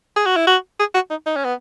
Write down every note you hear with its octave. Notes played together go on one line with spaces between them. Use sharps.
G#4
F#4
E4
F#4
G#4
F#4
D#4
D#4
C#4
B3